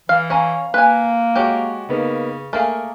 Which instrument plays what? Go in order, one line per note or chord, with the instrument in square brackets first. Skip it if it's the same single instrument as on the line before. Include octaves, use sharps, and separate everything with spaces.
[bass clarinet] E3 [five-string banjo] F5
[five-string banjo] C#4 C#5 [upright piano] F5 A#5
[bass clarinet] A#3 [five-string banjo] B4 G#5
[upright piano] G#3 F#4 [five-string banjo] G4 C#5
[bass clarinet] C#3 [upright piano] A#3 B3 D#4
[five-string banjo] A3 A#3 G#4 [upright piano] A#4